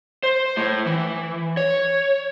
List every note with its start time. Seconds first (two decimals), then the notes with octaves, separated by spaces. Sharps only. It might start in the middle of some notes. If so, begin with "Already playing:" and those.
0.23 C5
0.57 A2
0.87 E3
1.57 C#5